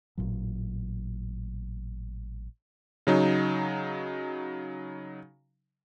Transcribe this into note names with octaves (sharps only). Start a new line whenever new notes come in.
A1 A#2 F#3
C#3 F#3 D#4